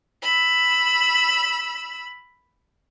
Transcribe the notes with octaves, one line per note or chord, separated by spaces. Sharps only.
B5 E6